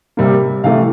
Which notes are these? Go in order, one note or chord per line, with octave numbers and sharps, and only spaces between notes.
C3 G3 A#3
C3 E3 A3 F5